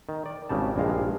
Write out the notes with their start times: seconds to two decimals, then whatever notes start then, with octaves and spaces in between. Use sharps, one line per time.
0.09 D#3
0.26 D5
0.49 G#1 C#3 G3 A5
0.76 A#1 G2 G#3 F5